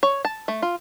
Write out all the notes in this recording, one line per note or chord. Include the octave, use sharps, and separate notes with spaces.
C#5
A5
A3
F4